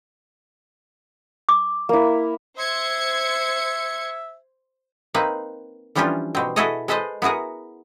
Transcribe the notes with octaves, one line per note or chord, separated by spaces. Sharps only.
D6
A#3 E4
C5 E5 G#6 C#7
A#3 C4 D#4 B4
E3 F3 G3 C#4 D4 F4
B2 C4
E4 F#4 G#4 A4 C#5 D#5
G#3 A4 B4 C5 D#5
B3 E4 F#4 G#4 A#4